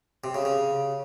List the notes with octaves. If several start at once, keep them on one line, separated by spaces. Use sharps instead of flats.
C3
C#3
C#3